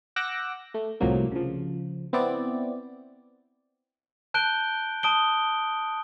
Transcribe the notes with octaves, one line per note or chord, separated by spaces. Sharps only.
F#5 D6 E6 F#6 G6 A#6
A3
C2 A2 C3 F3 F#3 A#3
C#3 F3
B3 C4 E4 D5
A5 F#6 G6 D7 G7
A5 D#6 D7 G7